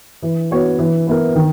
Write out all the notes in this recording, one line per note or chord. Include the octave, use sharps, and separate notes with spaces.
E3
B3 F#4 C#5
E3
B3 E4 A#4
D#3